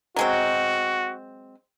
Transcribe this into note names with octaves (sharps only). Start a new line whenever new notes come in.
F#3 G#3 C4 F#4